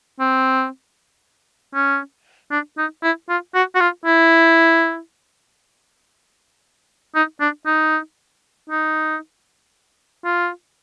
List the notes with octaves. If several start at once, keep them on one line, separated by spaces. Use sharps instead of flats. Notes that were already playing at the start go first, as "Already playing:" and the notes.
C4
C#4
D4
D#4
E4
F4
F#4
F#4
F4
E4
D#4
D4
D#4
D#4
F4